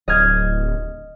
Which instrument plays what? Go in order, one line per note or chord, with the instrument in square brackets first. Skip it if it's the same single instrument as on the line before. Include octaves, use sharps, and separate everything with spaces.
[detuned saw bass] D1 [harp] D#5 F6 G#6